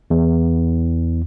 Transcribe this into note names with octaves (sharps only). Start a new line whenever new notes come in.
E2